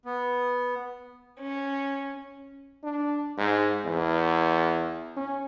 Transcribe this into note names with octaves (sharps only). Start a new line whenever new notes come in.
B3
C#4
D4
G#2
E2
C#4